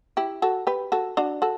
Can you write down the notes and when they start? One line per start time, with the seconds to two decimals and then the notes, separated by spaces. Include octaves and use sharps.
0.17 E4 G4
0.42 F#4 A4
0.67 G4 B4
0.92 F#4 A4
1.17 D4 F#4
1.42 F#4 A4